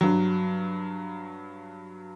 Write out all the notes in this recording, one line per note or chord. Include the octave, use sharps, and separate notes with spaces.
G2 F#3